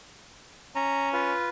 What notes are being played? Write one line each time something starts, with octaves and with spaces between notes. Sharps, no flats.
C#4 A#5
F4 B4